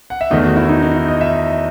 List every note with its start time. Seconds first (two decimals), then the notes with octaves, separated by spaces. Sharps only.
0.10 F#5
0.21 E5
0.31 E2 D#3 A3 D#5
0.44 F#4
0.56 E4
0.69 D#4
0.82 D#4
0.95 E4
1.08 D#5
1.21 E5